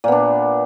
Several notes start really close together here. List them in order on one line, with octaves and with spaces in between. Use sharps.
A#2 B3 D4